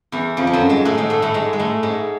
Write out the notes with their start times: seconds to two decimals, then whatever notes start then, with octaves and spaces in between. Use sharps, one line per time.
0.12 E2 E3
0.37 F2 F3
0.47 F3
0.53 F#2 F#3
0.69 G#2 G#3
0.85 A2 A3
0.98 G#2 G#3
1.10 A2 A3
1.22 A2 A3
1.34 G#2 G#3
1.53 G#3
1.59 A2 A3
1.83 G#2 G#3